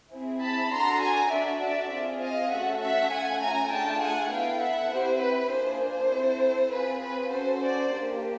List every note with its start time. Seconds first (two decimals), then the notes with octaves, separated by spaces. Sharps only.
0.12 C4 E4 G#4
0.42 A5 B5
0.71 D4 F#4 A4 A#5 C6
1.02 G#5 A#5
1.31 D4 F#4 A4 D5 E5
1.61 D5 E5
1.91 C4 F4 G#4
2.22 D#5 F5
2.51 A3 C#4 F#4 A4 E5 F#5
2.81 E5 F#5
3.11 A3 C#4 F4 A4 F#5 G#5
3.41 G#5 A#5
3.71 A3 D4 F4 G#4 G5 A5
4.01 F#5 G#5
4.31 B3 E4 A4 F5 G5
4.60 E5 F#5
4.91 C4 E4 G4 C5
5.21 B4
5.50 A#3 D4 F4 G#4 C5
5.80 C5
6.10 C4 E4 A4
6.70 C4 F4 G#4 B4
7.00 B4
7.30 C#4 F#4 A4 C5
7.60 C5 D5
7.90 A#3 D4 G4